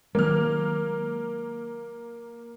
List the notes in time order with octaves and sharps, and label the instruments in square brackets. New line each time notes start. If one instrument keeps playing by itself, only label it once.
[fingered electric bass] D#3 F#3 G#3 [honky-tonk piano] A#3 F6